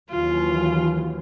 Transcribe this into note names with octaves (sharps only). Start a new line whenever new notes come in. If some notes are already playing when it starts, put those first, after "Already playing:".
D#2 E3 F#3 F4